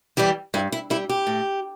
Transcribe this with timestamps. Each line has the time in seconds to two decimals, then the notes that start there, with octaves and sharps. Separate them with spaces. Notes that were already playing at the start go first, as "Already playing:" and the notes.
0.17 E3 G3 G4
0.54 G2 E4
0.72 E4
0.90 G3 E4
1.09 G4
1.27 A2